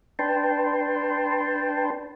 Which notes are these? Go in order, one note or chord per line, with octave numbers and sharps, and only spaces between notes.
D4 B4 G5 A5 C6